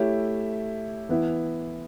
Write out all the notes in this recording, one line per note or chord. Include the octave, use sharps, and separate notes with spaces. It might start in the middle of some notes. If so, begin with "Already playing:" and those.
Already playing: A3 E4 G4 C#5 E5
E3 B3 E4